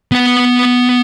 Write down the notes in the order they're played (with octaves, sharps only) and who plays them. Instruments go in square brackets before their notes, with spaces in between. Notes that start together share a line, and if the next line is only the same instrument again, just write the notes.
[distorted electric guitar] B3 F#5